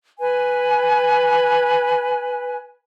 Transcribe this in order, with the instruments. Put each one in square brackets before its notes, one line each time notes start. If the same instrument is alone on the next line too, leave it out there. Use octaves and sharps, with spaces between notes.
[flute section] B4 G#5